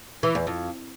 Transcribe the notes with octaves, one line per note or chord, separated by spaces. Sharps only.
E3
E2
F2